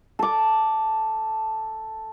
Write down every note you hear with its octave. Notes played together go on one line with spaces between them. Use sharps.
A4 D6